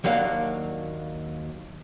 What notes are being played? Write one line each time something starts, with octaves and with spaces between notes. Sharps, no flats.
D#2 F#3 A#3 D4 F5